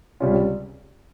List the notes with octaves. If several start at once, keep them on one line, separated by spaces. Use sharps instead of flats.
C#2 C3 G3 C#4 F4